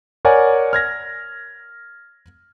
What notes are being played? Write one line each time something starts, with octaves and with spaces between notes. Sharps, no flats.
A#4 C#5 D5 F#5 G#5
F6 G#6 A#6